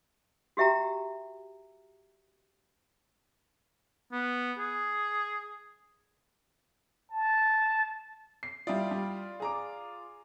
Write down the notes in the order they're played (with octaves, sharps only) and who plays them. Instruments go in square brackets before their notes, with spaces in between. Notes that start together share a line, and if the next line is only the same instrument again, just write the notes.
[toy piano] F#4 G4 E5 G5 A#5
[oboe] B3
G#4
[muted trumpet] A5
[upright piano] C7
[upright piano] G3 E4 [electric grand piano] F4 D5 D#6
[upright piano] G3
G#4 A#5 D6